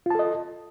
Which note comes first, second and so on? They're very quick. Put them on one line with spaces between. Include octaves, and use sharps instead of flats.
F4 A5 A4 D#5